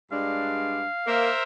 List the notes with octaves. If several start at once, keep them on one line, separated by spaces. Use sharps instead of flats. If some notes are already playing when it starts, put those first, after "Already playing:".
G2 G#3 D4 F5
A#3 A#4 C5 E5